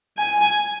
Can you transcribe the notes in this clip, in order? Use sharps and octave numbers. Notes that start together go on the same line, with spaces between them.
G#5